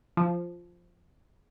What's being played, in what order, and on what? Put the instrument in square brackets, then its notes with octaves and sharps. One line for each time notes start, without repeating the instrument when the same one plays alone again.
[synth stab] F3